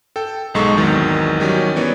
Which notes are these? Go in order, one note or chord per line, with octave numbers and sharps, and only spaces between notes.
A4 G5
B1 G#2 G#3 D#4 A4 C#6
G#1 E2 D#3 F#3
D#3 F#3 G3 C#4
E3 B3 C#5 D5